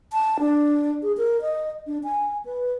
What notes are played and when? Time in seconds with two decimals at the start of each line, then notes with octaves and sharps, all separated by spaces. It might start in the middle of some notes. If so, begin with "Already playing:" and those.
0.13 A5
0.40 D4
1.03 G#4
1.17 A#4
1.41 D#5
1.87 D4
2.04 G#5
2.46 B4